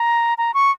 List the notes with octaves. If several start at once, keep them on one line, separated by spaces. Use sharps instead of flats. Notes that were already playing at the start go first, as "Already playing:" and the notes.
Already playing: A#5
A#5
C#6